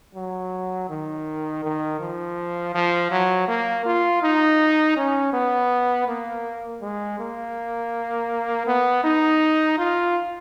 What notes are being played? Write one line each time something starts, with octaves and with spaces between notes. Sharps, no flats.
F#3
D#3
D#3
F3
F3
F#3
A#3
F4
D#4
C#4
B3
A#3
G#3
A#3
B3
D#4
F4